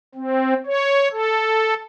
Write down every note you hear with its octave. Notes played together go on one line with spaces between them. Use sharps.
C4
C#5
A4